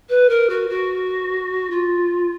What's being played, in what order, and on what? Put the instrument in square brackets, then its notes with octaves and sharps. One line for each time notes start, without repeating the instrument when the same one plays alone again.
[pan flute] B4
A#4
F#4
F#4
F4